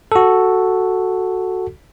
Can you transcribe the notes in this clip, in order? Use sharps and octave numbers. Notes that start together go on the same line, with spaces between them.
F#4 A4